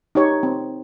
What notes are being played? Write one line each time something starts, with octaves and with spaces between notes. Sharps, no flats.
D#4 G4 C#5
C4